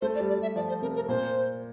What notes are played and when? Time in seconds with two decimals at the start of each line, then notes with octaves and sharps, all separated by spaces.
0.02 A3 C5
0.15 D5
0.20 G3
0.29 D5
0.38 G3 E5
0.56 F3 D5
0.69 C5
0.82 C3 A#4
0.96 A#4
1.09 A#2 C5